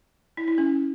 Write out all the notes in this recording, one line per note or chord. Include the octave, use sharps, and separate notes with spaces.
E4
E4
C#4